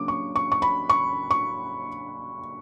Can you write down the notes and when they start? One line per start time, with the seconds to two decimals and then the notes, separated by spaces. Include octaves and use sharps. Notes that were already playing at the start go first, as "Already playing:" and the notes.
Already playing: C#3 F#3 A#3 D4 D6
0.08 C#6
0.36 C#6
0.52 C#6
0.62 B5
0.90 C#6
1.31 C#6